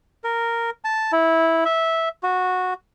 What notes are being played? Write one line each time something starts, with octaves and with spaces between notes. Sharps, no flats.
A#4
A5
E4
E5
F#4